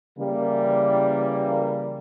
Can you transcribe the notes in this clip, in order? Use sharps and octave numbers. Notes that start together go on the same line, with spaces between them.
C#3 E3 G3 A#3